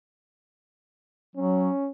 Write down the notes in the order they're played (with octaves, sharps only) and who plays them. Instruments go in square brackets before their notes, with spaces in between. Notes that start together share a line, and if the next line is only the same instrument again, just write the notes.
[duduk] F#3 [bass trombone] C#4